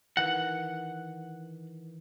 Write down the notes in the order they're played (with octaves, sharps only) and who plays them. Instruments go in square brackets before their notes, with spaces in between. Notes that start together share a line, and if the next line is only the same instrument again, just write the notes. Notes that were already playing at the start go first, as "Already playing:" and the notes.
[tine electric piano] D#3 E3 [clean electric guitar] F#5